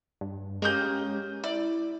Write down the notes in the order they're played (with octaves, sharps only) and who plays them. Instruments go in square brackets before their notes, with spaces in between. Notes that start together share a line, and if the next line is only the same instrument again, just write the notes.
[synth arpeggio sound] G2
[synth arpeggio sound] G#3 C#4 G4 [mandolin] A#3 D#6 G6
[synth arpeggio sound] E4 [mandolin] D5